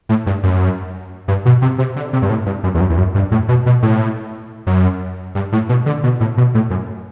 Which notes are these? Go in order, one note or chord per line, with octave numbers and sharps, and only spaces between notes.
A2
G2
F#2
G2
B2
C3
C3
D3
C3
G2
A2
G2
F#2
E2
F#2
E2
F#2
G2
A2
B2
B2
A2
F#2
G2
A2
B2
D3
B2
A2
B2
A2
F#2